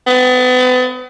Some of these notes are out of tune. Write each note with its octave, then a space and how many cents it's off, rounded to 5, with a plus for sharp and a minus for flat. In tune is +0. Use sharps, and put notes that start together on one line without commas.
B3 +35